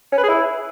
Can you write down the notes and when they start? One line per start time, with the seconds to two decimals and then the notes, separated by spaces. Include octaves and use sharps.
0.12 C#4
0.18 B4
0.23 G#4
0.29 E4